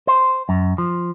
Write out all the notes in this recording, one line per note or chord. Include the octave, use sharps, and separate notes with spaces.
C5
F#2
F3